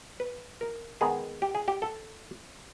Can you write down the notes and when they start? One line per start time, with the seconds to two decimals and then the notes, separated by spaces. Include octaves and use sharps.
0.20 B4
0.61 A#4
1.01 D#3 G#3 B3 G#4
1.42 G4
1.55 G#4
1.68 G4
1.82 A4